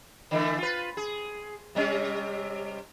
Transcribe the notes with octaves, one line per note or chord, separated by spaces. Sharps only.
D3 E3 A3
F4 B4
G#4
C3 G3 C#4